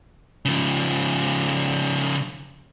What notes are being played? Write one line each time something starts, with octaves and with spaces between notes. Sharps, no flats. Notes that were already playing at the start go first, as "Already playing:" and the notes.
C#3 F3